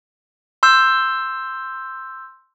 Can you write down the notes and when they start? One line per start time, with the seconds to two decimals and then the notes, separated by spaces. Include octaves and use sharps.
0.63 C6 E6 G6